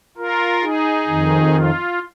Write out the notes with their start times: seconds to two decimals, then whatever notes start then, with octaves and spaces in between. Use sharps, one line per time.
0.17 F4 A#4
0.62 D#4 G#4
1.07 F2 D#3
1.52 F4